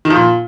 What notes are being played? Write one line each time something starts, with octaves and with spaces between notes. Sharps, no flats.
D#3
F3
A#2